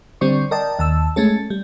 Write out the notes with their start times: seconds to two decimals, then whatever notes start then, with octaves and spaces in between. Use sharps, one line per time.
0.21 D3 G3 C4 C5 D5 C#6
0.51 A#4 D5 D#5 G5 A5
0.79 D#2 A5 E6
1.16 G#3 A3 C#4 A4
1.50 G3